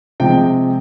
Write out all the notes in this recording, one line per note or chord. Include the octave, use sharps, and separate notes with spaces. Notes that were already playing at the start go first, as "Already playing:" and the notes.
C3 F3 G#3 G5